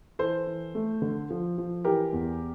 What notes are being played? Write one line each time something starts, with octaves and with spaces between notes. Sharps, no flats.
E3 A4 C5
E3
A3
D3
F3
F3
E3 G4 A#4
E2